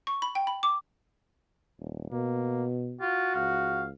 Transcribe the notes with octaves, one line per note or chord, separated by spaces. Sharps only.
C#6
B5
G5
B5
D6
D#1
B2 A#3
F4 F#4
C#2 F5